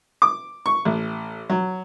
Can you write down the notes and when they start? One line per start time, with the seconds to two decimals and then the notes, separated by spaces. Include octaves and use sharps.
0.22 D6
0.66 C#6
0.85 A1
1.50 F#3